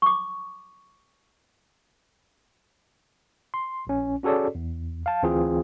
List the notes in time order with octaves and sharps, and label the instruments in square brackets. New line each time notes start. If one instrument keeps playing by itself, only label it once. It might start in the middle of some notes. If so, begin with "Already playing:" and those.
[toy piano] C#6 D6
[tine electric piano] C6
A#1 C#4
C#4 F#4 G#4 A4 C#5 D5
E2
F5 A5
D2 E3 C4 F4 G#4